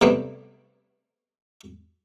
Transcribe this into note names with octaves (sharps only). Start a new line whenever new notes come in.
C3 G3 A3 B3 D4